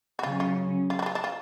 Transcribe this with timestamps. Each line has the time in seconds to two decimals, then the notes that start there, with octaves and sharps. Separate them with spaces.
0.19 F#4
0.23 C#3 F#3 C#4 F4
0.40 F4
0.90 F4
0.99 F#4
1.02 D4
1.06 F4
1.15 D4
1.24 F4